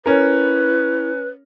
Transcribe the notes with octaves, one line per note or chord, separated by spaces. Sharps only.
C#4 E4 A#4 B4